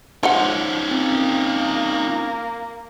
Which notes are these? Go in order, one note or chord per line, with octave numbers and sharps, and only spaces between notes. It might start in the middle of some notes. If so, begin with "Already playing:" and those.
F3 C#4 D#4 F#5
A#3 C4